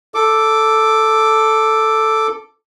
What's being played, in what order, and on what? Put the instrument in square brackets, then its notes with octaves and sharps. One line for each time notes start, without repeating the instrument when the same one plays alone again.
[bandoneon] A4 D6